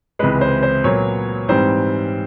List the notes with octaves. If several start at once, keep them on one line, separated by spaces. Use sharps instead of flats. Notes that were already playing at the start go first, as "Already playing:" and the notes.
C#2 C3 E3 G#3 B4
C5
C5
A#2 F#3 B3 C#5
G#2 E3 G3 C4 C5